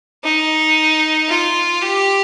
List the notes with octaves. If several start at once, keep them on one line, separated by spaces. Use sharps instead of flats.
D#4
F4
G4